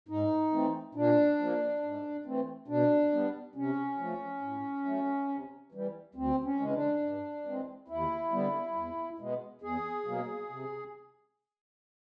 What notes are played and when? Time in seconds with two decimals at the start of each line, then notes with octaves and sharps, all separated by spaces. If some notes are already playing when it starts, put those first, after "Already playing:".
0.09 G#2 D#4
0.52 E3 A3 C4
0.95 A#2 D4
1.38 F3 A#3
1.82 G#2
2.26 E3 A3 C4
2.68 B2 D4
3.12 G3 B3
3.55 C3 C#4
3.98 F3 A3
4.42 A2
4.85 F#3 A3
5.28 C3
5.72 E3 G3
6.15 D2 C4
6.44 C#4
6.59 C#3 E3 G#3
6.74 D4
7.01 G2
7.45 E3 G#3 C4
7.88 D#2 E4
8.32 D3 G3 B3
8.75 E2
9.18 B2 G#3 B3
9.62 E2 G#4
10.05 B2 F#3 A#3
10.49 C3